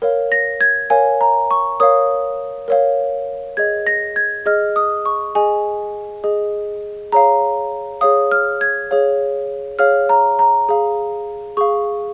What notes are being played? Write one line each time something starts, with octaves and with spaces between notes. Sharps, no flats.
A#4 C#5 F5
A#6
G#6
A#4 C#5 F5 G#5
A#5
C#6
A#4 C#5 F5 D#6
A#4 C#5 F5
G#4 D#5 G#6
A#6
G#6
G#4 D#5 F6
D#6
C#6
G#4 D#5 G#5
G#4 D#5
G#4 C#5 F5 A#5
G#4 C#5 F5 D#6
F6
G#6
G#4 C#5 F5
G#4 C#5 F5 F6
A#5
A#5
G#4 F5
G#4 F5 C#6